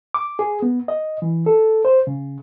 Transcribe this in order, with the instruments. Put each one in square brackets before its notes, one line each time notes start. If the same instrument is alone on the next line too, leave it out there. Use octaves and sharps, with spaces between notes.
[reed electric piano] D6
G#4
B3
D#5
E3
A4
C5
C#3